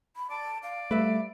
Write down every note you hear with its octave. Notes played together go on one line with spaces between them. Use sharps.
B5
D5 A5
D5 F5
G3 A3 B4 E5